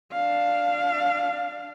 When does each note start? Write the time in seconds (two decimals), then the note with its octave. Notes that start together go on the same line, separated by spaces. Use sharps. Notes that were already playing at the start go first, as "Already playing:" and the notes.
0.12 D4 F5